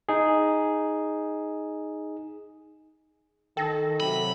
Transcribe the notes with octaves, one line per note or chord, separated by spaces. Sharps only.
D#4 G#4
D#3 A4 G5 A#6
C3 F#3 B5